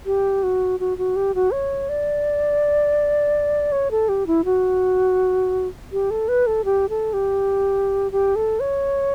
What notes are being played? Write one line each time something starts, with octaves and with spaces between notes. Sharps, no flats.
G4
F#4
F#4
F#4
G4
F#4
C#5
D5
C#5
A4
G4
E4
F#4
G4
A4
B4
A4
G4
A4
G4
G4
A4
C#5